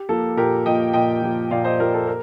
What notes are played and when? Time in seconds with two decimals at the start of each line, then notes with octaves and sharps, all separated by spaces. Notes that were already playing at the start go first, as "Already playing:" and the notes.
Already playing: G4
0.09 F3 A#3 A4
0.37 A#2 G4 A#4
0.66 F3 A#3 D#5 G5
0.93 A#2 D#5 G5
1.22 F3 A#3
1.51 A#2 D5 F5
1.64 C5 D#5
1.79 F3 A#3 A#4 D5
1.94 A4 C5
2.08 A#4